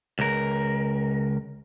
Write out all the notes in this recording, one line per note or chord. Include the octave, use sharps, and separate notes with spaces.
C#2 A#4